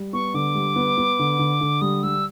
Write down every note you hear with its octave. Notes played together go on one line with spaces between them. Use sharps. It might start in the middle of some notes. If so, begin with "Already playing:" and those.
Already playing: G3
B3 C#6
D3 D6
G3
B3
B3
D3
D3
D3
G3 D#6
G3 E6